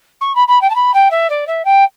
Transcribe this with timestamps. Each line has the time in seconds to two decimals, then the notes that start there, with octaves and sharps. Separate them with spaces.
0.21 C#6
0.35 B5
0.48 B5
0.61 G5
0.70 A5
0.75 B5
0.94 G5
1.11 E5
1.30 D5
1.47 E5
1.65 G5